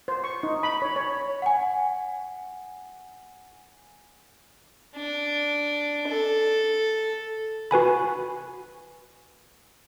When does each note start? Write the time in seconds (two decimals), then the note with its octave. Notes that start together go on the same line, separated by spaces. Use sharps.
0.08 C5
0.24 C#6
0.43 D#4
0.63 B5
0.82 C#5
0.96 C#5
1.42 F#5 G#5
4.96 D4
6.08 A4
7.71 F#4 B4 G#5 B5